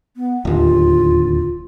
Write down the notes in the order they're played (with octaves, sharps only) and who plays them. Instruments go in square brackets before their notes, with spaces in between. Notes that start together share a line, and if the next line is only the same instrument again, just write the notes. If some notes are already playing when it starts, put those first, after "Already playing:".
[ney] B3
[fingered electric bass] D1 D#2 [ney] F4